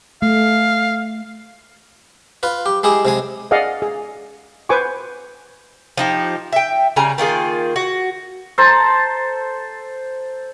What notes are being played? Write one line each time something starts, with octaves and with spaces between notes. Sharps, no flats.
A3 F5
F4 B4
G4
G#3 E4 G4 G#4
C3 G#3 G#5
G#4 D5 D#5 F5 F#5
G#4
B4 C5 G#5 C#6 D6
F3 D#4 G4
E5 G5
C#3 G3 G#5 A#5
D#3 A#3 F4 G#4
F#4
A4 C5 A5 A#5